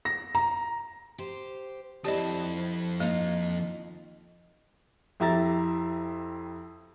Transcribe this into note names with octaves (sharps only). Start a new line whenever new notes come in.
A#6
A#5
G4 C5
F2 E4 G4 C5 D5 D#5 G5 A5
A#3 D#4 F4 D#5
F2 E4 G4 E5 A#5 A6